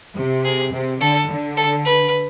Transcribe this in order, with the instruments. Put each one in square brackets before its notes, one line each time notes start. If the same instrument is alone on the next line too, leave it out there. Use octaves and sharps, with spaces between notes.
[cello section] C3
[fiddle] G#4
[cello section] C3
[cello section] D3 [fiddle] A4
[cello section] D3
[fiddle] A4
B4